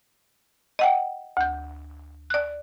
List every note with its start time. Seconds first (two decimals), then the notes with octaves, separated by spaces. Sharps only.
0.79 D#5 F#5 G5
1.37 D2 G6
2.30 D5 F#6